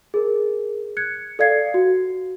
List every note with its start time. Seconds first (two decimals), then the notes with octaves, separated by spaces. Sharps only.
0.14 G#4 A#4
0.97 F#6 G#6 C#7
1.39 A4 D5 F5 G#6 C7 C#7
1.74 F#4